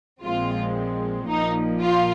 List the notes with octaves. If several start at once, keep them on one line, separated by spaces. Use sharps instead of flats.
A#1 A#2 F3 G#3 C4 F4
A#1 A#2 F3 A#3 D#4
F4